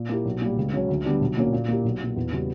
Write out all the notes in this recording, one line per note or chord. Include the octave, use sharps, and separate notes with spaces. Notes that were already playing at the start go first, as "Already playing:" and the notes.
Already playing: A#2
A#3 E4 G4
B1
A#2 G3
C#2
C#3 F#3 C#4
D2
D3 G3 B3 D4
B1
A#2 A#3 C#4 F#4
A#2
A#3 E4 G4
B1
A#2 A#3
E2
C#3 G3 B3 F#4